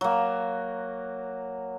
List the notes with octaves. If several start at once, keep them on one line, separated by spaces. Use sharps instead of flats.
F#3 A#3